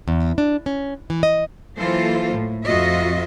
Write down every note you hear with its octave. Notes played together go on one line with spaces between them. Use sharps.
E2
D4
C#4
E3
D#5
E3 F#3 A#3 F4 A4 C5
A2
F2 F4 F#4 D#5 E5